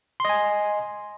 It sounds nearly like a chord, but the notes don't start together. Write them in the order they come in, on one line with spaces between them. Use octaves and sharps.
C6 D#5 G#5